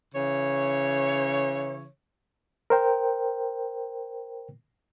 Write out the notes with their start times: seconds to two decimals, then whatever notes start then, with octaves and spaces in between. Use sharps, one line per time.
0.14 C#3 E3 C#5
2.70 A#4 C5 G5